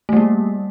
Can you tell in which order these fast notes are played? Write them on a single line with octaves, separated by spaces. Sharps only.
A3 G3 A#3